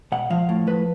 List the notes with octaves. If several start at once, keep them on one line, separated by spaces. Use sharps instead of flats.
B2 F#5
F3 F5
A2
F3 B4